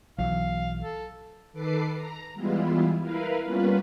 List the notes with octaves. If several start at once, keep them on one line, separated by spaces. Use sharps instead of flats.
B1 E3 F#3 F5
A4
D#3 A4 B4 D6 C7
A#5
E3 G3 G#3 B3 E4 F4
E4 A#4 B4 F5
G3 A#3 B3 C#4 F4 B4